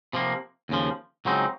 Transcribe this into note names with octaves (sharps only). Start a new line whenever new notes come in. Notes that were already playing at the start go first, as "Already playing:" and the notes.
C3 F3 A#3
D#2 C#3 F3
C#2 C#3 F#3 C4 D#4